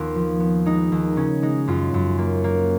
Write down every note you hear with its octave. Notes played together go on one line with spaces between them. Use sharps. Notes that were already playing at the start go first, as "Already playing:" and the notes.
Already playing: D#2 B3 F4
F3
B3
G#3 D#4
D#2
C#3 C#4
G#3 D#4
F#2 F4
F#2
A#3
A#3